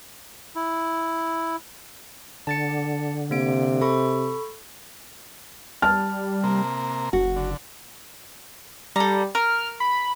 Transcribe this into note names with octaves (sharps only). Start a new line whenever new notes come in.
E4
D3 A5 A6 C#7
C3 A#3 D7
A4 B5 C#6
G3 A5 F6
C3 A#3
F#1 F#4
D3
G3 A4 A#5
A#4 F6
B5